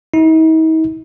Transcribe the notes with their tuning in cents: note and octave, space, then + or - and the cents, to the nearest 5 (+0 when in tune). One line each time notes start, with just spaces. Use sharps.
D#4 +45